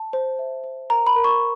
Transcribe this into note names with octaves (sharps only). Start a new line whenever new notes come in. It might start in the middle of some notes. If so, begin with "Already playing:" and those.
Already playing: A5
C5
E5
C5
A#4 A#5
B5
A#4
C#6